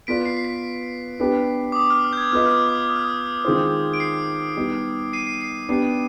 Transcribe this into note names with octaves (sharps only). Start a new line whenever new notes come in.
B3 F4 B4 D5 B6 D7
C7
C7
B6
B3 D4 G4 B4
D6
D#6
F6
F6
G6
G#6
B3 F4 B4 D#5 F6
F6
D#6
D6
D#6
F6
D#6
D#3 G#3 C4 F4 C5
D7
C7
G3 B3 D#4
C7 D#7
C7 D#7
C7 D#7
B3 D4 G4 C7